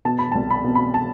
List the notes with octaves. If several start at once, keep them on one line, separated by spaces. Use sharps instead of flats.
B2 A5
B5
C2 A5
B5
B2
B5
A5